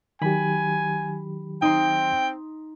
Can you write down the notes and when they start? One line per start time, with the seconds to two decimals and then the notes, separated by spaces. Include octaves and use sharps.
0.22 D#3 F#3 G4 G#5 B5
1.62 C4 D#4 G5 C6